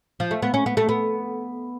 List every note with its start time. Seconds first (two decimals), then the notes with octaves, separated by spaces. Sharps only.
0.20 F3
0.31 A3
0.42 B3
0.54 C#4
0.66 B3
0.77 A3
0.89 B3